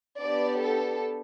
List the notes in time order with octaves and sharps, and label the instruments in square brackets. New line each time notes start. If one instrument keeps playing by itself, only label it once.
[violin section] B3 D4 G4 D5
A4